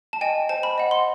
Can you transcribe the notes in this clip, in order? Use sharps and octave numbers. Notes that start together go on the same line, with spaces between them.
A5
D#5 G5 G#5
C5 A5
B5
D#5 F#5
C6